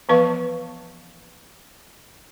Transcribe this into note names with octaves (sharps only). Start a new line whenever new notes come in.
E3 F3 B3 B4 F5 C#6